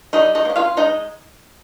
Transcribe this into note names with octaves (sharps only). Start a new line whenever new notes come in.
G3 D#4 D#5
D#4 D#5
A#3
C#4
F4 F5
G#3 D#4 D#5